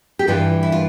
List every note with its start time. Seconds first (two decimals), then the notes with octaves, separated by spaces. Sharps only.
0.19 G4
0.28 G2 E3 F4
0.63 E4
0.72 F4